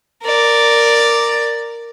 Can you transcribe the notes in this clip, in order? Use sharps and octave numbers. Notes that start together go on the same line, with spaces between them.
A#4 D5